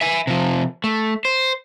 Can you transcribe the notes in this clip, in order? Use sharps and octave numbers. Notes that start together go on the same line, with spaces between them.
E5 G#5
C3 F3
A3
C5